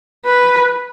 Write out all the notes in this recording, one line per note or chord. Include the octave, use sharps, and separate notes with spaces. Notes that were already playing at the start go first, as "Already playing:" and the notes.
B4